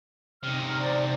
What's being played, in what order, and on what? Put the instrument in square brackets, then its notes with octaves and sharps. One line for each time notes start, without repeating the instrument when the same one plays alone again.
[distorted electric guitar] C3 D#4 [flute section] F6
[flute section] C5 D5